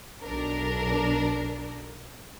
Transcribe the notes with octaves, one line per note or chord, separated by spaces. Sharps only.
B1 D4 A#4